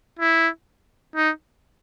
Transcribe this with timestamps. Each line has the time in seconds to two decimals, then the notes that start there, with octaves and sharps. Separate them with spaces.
0.19 E4
1.16 D#4